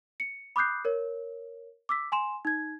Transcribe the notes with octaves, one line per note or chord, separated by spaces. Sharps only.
C#7
B5 D6 D#6 F#6 G6 C7
A#4 C#5
D6 E6 B6
G#5 C6 E7
D#4 G#6